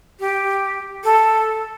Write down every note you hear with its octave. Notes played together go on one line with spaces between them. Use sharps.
G4
A4